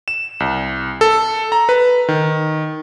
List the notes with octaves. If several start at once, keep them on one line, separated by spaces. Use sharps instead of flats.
E7
C2
A4
A#5
B4
D#3